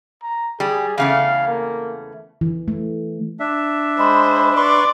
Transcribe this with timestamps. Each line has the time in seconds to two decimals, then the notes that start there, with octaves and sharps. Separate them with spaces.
0.23 A#5
0.60 G3 G#4
0.98 E2 C#3 A3 F5
1.47 A#3
2.41 E3
2.68 A3
3.40 D4 E5
3.98 G#3 C5 B5
4.57 B4 D5 C6 C#6